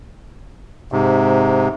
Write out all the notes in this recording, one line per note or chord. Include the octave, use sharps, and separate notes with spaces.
G#2 C3